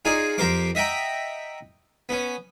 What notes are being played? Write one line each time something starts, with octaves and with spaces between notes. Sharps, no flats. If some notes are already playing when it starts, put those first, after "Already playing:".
D#4 F4 G#4 D5 G#5
F2 G4 A#4 C5 F5 D6
D#5 E5 F#5 G5 A#5
B3 C#4